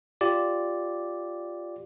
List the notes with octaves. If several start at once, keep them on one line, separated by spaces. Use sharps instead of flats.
F4 G4 D5